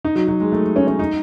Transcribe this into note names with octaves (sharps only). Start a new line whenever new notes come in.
D#4
F#3
F#3
G#3
A3
C#4
C#4
D#4